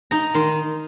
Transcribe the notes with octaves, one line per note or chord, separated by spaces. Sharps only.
D#4 A#5
D#3 C6